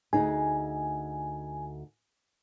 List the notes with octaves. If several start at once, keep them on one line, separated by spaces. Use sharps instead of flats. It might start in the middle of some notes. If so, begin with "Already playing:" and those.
D2 D#4 G#4 G#5